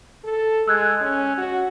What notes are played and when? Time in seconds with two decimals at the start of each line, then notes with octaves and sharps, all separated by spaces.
0.24 A4
0.68 G#3 E6 F#6 G#6
1.01 C#4
1.38 F#4